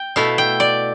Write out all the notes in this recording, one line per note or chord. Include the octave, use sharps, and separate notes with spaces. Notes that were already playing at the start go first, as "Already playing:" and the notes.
Already playing: G5
B2 A3 E4 F5
G5
D5